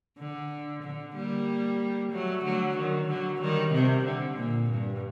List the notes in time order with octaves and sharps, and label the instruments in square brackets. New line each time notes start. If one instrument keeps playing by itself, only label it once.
[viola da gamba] D3
D3
G3 A#3
F#3 A3
D3 F#3
D#3
D3 F#3
D#3 G3
C3
D3
A#2
G2